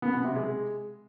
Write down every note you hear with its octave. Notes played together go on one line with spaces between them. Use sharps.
B3
B2
C3
G#3